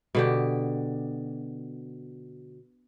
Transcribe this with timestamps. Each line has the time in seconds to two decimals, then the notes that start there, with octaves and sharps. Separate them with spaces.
0.15 B2 D3 G4